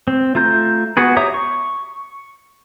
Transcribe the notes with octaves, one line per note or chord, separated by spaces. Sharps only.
C4
A3 F4 A#5 G6
B3 F#4 G#4 B4
G4 C#5 E5 A#5 D#6
C#6